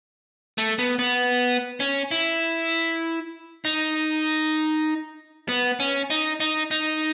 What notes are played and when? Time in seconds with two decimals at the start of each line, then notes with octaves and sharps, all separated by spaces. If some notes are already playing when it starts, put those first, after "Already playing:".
0.58 A3
0.79 B3
0.99 B3
1.80 C#4
2.11 E4
3.65 D#4
5.49 B3
5.80 C#4
6.10 D#4
6.40 D#4
6.71 D#4